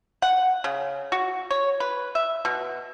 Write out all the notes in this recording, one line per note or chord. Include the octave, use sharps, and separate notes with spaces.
F#5
C#3
F#4
C#5
B4
E5
B2